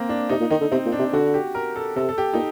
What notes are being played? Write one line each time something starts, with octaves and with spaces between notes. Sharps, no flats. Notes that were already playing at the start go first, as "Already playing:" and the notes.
Already playing: A#3 C4
D4
C3 D#4
A#2
D#3 D#4
D3
C3 C4
A#2
D4
C3
D3 F#4
G4
A#4
A4
C3 A4
A4
G4
A#2 D#4